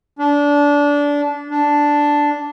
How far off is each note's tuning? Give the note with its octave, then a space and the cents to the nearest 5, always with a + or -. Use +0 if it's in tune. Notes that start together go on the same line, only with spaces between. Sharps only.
D4 -20
D4 -5